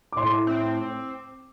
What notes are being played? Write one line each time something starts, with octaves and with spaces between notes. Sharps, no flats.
D6
A2 C6
C4